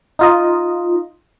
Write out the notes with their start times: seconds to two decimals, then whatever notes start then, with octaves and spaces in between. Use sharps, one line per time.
0.19 D#4 F4 D#5